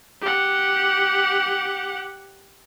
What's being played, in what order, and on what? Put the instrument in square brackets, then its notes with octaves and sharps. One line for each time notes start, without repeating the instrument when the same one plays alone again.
[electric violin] G4 F#5